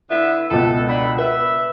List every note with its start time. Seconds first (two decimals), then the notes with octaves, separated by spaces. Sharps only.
0.10 D3 B3 E4 E5
0.51 C#2 B2 A4
0.88 D3 B5
1.19 B4 E5